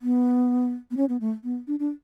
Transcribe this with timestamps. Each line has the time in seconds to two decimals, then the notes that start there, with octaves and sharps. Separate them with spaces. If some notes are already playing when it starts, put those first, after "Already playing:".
0.02 B3
0.91 B3
0.97 C#4
1.09 B3
1.21 A3
1.44 B3
1.67 D4
1.79 D4